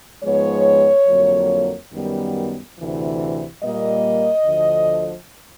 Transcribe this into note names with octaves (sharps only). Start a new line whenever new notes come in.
G#2 F3 G#3 B3 C#5
F2 D3 F#3 A#3
F#2 D#3 G3 B3
D2 C3 E3
A#2 G3 A#3 D#5
D2 D3 F3